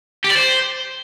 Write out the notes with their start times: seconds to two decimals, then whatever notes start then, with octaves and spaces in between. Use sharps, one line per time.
0.24 G4
0.30 D5
0.36 C5